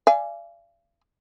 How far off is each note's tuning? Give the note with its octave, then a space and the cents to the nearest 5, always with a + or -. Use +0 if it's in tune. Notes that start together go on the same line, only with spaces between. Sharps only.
D5 +0 F5 -40 G#5 +0